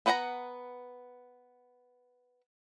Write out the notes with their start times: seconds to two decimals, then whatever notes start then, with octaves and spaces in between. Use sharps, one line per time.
0.06 B3 B4 F#5 G#5 A#5